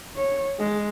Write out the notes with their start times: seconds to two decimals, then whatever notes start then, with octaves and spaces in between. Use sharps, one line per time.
0.16 C#5
0.59 G#3